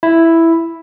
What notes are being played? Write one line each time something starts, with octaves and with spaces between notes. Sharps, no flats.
E4